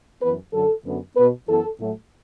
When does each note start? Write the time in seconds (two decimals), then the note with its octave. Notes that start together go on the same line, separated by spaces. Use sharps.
0.21 F#2 E3 B3 B4
0.52 F#2 D3 F#3 A4
0.85 F#2 D3 B3
1.16 B2 B3 B4
1.47 F#2 E3 B3 A4
1.79 A2 F#3 A3